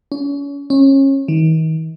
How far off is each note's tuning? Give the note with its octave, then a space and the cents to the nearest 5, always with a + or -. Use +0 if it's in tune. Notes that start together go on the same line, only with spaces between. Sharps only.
C#4 +35
C#4 -25
D#3 +40